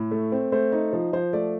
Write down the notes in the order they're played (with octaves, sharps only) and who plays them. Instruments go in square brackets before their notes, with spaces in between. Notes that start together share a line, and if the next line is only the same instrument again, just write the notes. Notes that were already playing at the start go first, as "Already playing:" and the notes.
Already playing: [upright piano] A2
A3
C4
A3 C5
D#4
F3
F3 C5
A3 D5